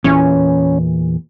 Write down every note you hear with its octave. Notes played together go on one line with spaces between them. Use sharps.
E2 A#2 E3 C#4